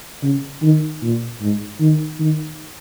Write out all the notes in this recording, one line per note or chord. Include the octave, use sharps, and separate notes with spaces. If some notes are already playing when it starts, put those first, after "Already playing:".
C#3
D#3
A#2
G#2
D#3
D#3